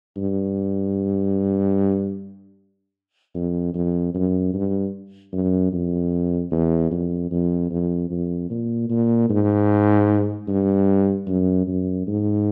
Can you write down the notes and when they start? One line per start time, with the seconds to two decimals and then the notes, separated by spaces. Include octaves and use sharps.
0.17 G2
3.35 F2
3.74 F2
4.14 F#2
4.54 G2
5.33 F#2
5.72 F2
6.51 E2
6.91 F2
7.31 F2
7.71 F2
8.10 F2
8.50 A#2
8.90 A#2
9.29 G#2
10.48 G2
11.27 F#2
11.67 F#2
12.07 G#2